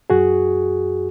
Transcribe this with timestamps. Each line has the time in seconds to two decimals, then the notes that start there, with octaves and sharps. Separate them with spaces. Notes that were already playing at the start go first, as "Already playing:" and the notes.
0.10 F#2 F#4 G#4